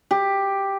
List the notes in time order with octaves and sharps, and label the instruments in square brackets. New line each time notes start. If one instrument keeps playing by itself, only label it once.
[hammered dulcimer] G4